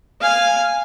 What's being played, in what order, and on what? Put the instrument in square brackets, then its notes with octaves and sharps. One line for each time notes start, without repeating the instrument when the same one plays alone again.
[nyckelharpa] F5 G#5